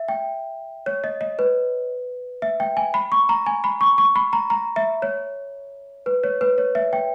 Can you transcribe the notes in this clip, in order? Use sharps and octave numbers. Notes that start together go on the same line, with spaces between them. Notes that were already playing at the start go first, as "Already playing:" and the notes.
Already playing: E5
G5
C#5
D#5
D#5
B4
E5
G5
G#5
B5
C#6
A#5
G#5
B5
C#6
C#6
B5
A#5
A#5
E5
C#5
B4
C#5
B4
C#5
E5
G5